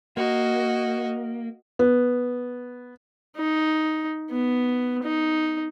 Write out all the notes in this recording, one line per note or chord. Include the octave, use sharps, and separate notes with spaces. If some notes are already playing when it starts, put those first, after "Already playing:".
A#3 F#4 D#5
B3
D#4
B3
D#4